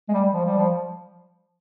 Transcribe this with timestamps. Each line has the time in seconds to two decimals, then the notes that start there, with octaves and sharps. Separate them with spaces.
0.09 G#3
0.14 G3
0.32 F3
0.45 G3
0.58 F3